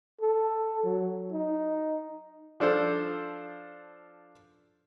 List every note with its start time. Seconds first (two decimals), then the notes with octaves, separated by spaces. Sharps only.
0.21 A4
0.84 F#3
1.33 D#4
2.60 F3 D4 A4 C5